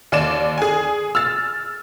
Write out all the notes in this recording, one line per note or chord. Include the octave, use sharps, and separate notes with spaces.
D#2 D5 E7
G#4 G#5
E6 F6 A6